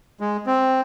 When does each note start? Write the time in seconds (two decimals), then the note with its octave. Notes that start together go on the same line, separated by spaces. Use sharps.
0.20 G#3
0.47 C4